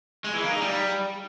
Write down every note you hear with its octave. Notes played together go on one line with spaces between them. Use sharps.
G#3
E3
A#3
D#4
G3